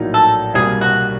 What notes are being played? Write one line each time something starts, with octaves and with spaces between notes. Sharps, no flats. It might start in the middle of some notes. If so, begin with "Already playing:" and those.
Already playing: A#1 A2 F#3 A#3 D#4
A4
C2 B2 G3 A#3 G#4
F#4